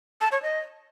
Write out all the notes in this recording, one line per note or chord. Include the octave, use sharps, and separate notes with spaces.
A5
C#5
D#5